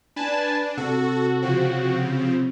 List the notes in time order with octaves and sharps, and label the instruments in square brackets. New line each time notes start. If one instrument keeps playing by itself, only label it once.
[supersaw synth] D4 [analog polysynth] B4 G#5 A5
[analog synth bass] C3 [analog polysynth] F#4 [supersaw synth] A4
[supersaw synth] C#3 F3 C4